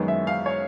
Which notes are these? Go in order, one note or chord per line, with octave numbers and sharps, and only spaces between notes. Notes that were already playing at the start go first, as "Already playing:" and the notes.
Already playing: F#2 D#3 G#3 B3
E5
F5
C#5